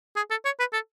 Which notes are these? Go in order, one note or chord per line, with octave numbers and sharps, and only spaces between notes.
G#4
A4
C#5
B4
A4